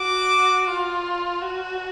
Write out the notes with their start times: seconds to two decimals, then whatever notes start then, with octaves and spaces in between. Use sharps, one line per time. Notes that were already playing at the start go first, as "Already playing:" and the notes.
Already playing: F#4 D6
0.68 F4
1.42 F#4